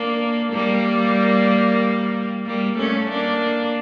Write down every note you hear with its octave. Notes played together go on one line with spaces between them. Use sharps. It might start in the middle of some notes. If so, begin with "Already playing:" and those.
Already playing: A#3 D4
G3 A#3
G3 A#3
A3 C#4
A#3 D4